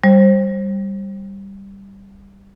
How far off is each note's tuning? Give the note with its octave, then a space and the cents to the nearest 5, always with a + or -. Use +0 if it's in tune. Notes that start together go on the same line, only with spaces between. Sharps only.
G3 +0 C5 +25